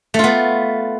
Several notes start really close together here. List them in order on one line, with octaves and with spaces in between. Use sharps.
A3 F4 B3